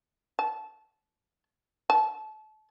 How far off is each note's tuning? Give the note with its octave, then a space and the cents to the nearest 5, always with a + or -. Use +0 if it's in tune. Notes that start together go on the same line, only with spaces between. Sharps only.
A5 -15
A5 -30